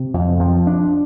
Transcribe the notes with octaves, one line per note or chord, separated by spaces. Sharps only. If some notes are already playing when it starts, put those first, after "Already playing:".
Already playing: C3
F2
F3
D4